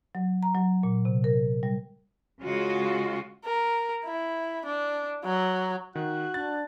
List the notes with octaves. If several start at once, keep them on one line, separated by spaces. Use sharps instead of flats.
F#3
A#5
F#3
A#2
C3
A#4
G3
C#3 G#3 F4 F#4
A#4
E4
D4
F#3
D#3 F#4 F#6
D4 A6